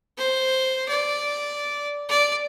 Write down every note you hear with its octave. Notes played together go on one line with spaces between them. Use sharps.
C5
D5
D5